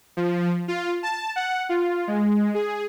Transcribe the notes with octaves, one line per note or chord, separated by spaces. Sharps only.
F3
F4
A5
F#5
F4
G#3
G#4